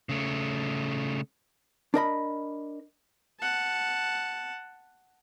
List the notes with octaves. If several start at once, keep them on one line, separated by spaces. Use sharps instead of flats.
C#3 A3
D4 A#4 D#5 B5
F#5 A5